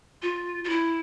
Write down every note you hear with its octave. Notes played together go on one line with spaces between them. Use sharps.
F4
F4
E4